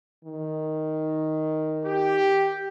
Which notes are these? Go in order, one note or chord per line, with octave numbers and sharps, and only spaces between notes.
D#3
G4